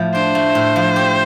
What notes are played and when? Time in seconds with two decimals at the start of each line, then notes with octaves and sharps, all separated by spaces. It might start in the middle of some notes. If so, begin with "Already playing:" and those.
Already playing: A2 F3 A3
0.14 D4 C5
0.35 A3
0.55 A2
0.76 F3
0.96 G4